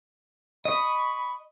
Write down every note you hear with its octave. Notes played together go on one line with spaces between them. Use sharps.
D#5 B5 C#6